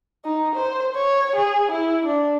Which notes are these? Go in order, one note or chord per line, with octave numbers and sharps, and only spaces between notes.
D#4
C5
C#5
G#4
E4
D4